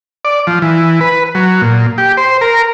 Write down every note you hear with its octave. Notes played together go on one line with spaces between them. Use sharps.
D5
F3
E3
B4
F#3
A#2
G4
C5
A#4